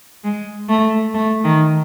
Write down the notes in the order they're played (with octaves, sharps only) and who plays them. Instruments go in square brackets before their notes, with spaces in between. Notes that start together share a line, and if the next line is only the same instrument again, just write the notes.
[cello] G#3
A3
A3
D#3